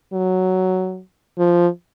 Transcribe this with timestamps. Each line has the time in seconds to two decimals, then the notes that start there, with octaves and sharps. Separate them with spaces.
0.13 F#3
1.38 F3